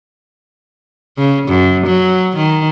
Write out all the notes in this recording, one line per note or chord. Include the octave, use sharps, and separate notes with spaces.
C#3
F#2
F#3
D#3